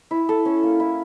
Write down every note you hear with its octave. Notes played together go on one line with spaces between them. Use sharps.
E4
A4
C#4
A#3
E4